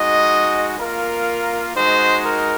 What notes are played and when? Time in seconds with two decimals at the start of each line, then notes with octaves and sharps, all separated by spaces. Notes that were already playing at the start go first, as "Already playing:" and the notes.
Already playing: G#3 D#4 F#4 D#5
0.78 A#3 F4 A#4
1.75 G#3 D#4 F#4 C5
2.25 A#4